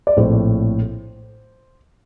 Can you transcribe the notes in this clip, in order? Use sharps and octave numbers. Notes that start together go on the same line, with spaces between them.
D5
A#1 A2 A3 C4 C5